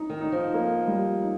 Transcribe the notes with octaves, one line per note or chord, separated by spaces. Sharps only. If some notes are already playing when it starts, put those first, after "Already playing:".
Already playing: D#4
D#3
D#4
F3
A#3
G3
D#4